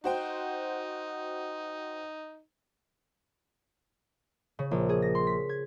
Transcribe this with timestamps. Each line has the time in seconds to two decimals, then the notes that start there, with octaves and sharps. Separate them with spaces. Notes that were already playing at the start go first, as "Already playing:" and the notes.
0.04 D#4 F#4 C5 G5
4.59 C#3
4.71 A#1
4.89 G#4
5.02 A#6
5.15 C6
5.27 B6
5.49 G#6